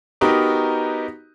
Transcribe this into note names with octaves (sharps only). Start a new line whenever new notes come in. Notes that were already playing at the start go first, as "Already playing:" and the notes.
B3 D#4 F#4 G4 A#4